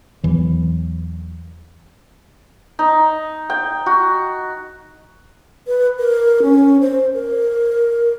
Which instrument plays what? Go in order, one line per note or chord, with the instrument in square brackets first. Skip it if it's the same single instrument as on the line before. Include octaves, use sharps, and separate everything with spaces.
[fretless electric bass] E2 E3 F#3
[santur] D#4
G5
F#4
[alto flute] B4
A#4
C#4
C5
A#4